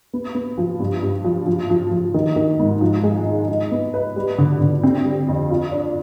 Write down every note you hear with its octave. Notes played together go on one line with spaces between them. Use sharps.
B3
B3
F3
G2
G2
F3
F3
F3
F3
D#3
D#3
G#2
F3
G#3
D#4
D#4
B3
B4
G3
D3
D3
C4
G3
F2
F4
D4